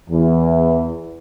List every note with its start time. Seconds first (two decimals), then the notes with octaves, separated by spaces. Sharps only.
0.10 E2 E3